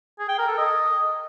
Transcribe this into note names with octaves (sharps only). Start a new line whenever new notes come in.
G#4
G5
A#4
A4
D#5